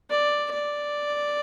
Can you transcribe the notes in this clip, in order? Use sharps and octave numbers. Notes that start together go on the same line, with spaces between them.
D5
D5